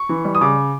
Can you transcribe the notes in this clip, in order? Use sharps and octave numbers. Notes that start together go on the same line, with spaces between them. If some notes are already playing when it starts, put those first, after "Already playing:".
Already playing: C#6
E3
G3
D#6
C#3 D6